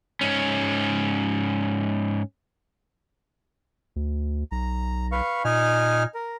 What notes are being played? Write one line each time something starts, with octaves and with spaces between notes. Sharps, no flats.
G#2 C#4
D2
B1 A#5
B4 F5 C#6
A#2 D#4 G#5 F6
A#4